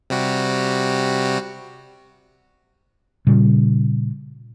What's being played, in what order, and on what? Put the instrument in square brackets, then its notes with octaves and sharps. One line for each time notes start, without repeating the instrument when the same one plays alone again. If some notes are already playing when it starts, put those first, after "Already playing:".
[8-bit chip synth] C3 G3 F#4
[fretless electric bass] A#2 C#3 G3